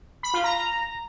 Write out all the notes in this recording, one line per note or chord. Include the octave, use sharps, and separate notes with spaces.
B5
F4
A#5